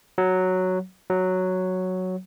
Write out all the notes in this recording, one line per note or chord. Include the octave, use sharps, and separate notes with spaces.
F#3
F#3